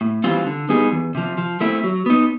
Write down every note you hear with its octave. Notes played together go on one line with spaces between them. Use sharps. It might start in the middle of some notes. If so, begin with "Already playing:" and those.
A2
E3 G3 C4 F4
D3
G3 B3 D#4 G#4
E2
C3 F3
F3
A3 C4 E4
F#3
B3 D#4